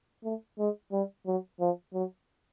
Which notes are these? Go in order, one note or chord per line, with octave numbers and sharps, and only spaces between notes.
A3
G#3
G3
F#3
F3
F#3